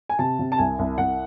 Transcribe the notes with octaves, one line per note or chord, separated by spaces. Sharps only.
G#5
C3 A5
C3
A5
C2 G#5
C2
C2 F#5